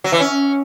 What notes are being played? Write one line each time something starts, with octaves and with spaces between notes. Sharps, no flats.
F#3
E3
C#4